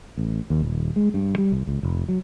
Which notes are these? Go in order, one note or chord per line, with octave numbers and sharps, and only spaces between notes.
A1
D#2
D#1
G#3
G2
G3
C2
C#2
F1
F#3